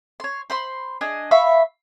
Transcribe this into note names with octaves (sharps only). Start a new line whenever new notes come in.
C#5 C6
C5 B5 C6
D4 G#4 D#5
E5 F5 B5 C#6